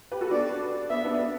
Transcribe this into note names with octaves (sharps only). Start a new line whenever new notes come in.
G4 B4
F#4 A4
B3 D4 D5
B3 E5
B3 D4
B3